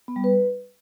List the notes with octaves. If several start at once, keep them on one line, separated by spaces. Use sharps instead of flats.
B3
G3
B4